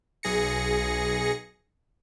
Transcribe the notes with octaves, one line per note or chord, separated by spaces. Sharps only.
B1 G#4 A#6 C#7